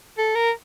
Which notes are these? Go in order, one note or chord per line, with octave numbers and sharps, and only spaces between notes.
A4
A#4